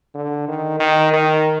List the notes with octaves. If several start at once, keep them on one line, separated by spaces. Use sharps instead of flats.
D3
D#3
D#3
D#3